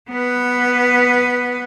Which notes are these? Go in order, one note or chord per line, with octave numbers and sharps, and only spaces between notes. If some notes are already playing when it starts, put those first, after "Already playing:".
B3 B4